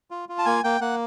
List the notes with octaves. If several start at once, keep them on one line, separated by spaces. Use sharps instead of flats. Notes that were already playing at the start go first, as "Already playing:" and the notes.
F4
F4
A5
A#3 G#5
A#3 G5
A#3 F#5